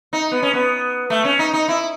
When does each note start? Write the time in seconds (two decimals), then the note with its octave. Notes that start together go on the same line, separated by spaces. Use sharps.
0.13 D#4
0.31 B3
0.43 C#4
0.54 B3
1.10 A3
1.24 C#4
1.39 D#4
1.53 D#4
1.68 E4